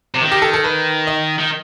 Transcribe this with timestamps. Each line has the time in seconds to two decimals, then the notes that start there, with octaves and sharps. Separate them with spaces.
0.14 C3
0.21 D#3
0.32 G4
0.42 A4
0.53 A4
0.64 B4
1.07 D#5
1.39 D#3